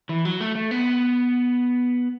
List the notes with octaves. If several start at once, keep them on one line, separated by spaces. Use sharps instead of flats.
E3
F#3
A3
A3
B3